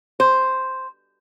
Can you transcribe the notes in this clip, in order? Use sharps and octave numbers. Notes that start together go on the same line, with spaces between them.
C5